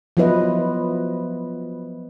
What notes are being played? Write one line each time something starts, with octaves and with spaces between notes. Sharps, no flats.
F3 F#3 B3 E4 B4 D#5